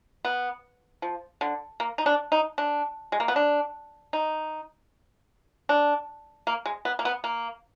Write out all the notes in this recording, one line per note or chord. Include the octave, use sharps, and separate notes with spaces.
B3
F3
D3
A#3
D#4
D4
D#4
D4
G#3
A#3
B3
D4
D#4
D4
A#3
G#3
B3
A#3
B3
A#3